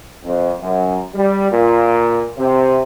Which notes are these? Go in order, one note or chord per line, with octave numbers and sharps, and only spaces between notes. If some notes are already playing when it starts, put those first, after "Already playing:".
F2
F#2
G3
A#2
C3